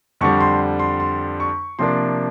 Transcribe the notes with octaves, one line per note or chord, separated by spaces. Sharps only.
F2 D3 G3 C#6
C6
C6
C6
C#6
C3 F3 A#3 D4 C6